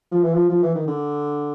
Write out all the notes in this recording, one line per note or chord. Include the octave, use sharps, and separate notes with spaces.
F3
E3
F3
F3
E3
D#3
D3